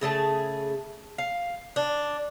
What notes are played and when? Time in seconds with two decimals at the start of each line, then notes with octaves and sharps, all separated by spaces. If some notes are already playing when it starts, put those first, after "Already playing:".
0.01 C#3 A3 G#4 A5
1.18 F5
1.76 D4